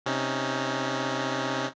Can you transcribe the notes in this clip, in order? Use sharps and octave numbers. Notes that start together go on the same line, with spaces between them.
C3 C#4 D#4